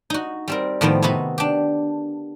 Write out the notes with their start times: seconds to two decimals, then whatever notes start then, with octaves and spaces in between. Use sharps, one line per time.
0.10 D#4 F#4
0.48 G3 C4 A#4
0.81 A2 D#3 F3 B3 C4
1.02 C3 B3 D#4 F#4 B4
1.38 D4 G4